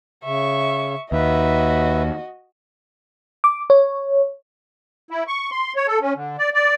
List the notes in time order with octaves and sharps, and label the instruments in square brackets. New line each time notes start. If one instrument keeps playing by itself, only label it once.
[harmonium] C#3 [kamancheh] E5 C#6
[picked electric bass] D#2 [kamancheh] F#4 D#5 [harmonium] B4 E5
[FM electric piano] D6
C#5
[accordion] E4
C#6
C6
C#5
A4
C#4
D3
D5
D5